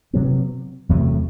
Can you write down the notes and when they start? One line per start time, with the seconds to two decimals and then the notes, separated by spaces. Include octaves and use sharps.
0.13 C3 F#3 B3
0.89 E2 C3 F#3 A3